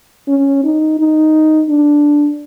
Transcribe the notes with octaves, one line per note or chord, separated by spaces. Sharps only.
C#4
D#4
D#4
D4